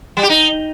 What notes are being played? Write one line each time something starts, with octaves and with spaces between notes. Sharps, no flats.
G3
G4
D#4